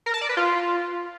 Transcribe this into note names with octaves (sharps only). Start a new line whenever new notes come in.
A#4
A5
D5
B4
F4